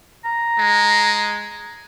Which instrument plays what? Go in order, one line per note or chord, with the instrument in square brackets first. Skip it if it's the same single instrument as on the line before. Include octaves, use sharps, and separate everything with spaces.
[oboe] A#5
[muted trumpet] G#3